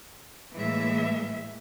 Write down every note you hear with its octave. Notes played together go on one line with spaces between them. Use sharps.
A2 E3 G#3 A#3 E5